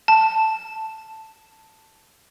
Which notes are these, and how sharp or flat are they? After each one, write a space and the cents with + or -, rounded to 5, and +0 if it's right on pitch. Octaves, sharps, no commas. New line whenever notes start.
A5 +0